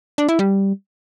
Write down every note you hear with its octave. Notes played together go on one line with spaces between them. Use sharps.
D4
E4
G3